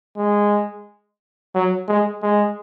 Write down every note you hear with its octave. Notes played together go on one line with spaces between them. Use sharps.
G#3
F#3
G#3
G#3